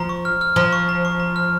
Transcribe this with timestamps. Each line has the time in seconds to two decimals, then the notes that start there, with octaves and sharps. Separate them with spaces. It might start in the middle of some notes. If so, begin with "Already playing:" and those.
Already playing: F3 A#5
0.09 C#6
0.25 F6
0.41 F6
0.56 F3 A#5
0.73 C#6
0.89 A#5
1.05 C#6
1.20 A#5
1.36 F6